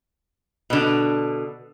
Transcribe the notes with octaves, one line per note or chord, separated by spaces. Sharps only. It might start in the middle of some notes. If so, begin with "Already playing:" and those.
B2 D3